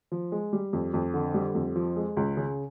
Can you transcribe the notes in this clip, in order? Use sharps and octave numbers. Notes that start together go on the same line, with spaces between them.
F3
G#3
G3
F2
F2
D3
G3
F2
F3
G#3
C#2
C#3